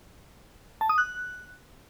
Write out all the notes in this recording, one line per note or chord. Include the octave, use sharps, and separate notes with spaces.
A5
D#6
F#6